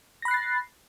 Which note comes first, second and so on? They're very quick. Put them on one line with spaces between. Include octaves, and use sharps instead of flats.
A#6 B5 F#6 C7 A6